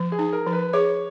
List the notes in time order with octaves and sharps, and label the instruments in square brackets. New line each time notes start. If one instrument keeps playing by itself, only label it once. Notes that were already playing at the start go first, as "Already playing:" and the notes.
Already playing: [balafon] F3
[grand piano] G#4
[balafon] D#4
[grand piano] A#4
[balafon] F3
[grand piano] B4
[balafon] G#4 [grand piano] C#5